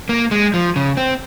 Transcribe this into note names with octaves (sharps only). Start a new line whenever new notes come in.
A#3
G#3
F3
C#3
C4